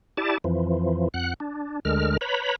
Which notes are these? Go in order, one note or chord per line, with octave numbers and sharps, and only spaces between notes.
E4 G4 D5 A5
F2 E3 F3
F2 F#5 F#6
D4
D2 D3 G#3 A#4 F6
B4 C#5 A#5 B5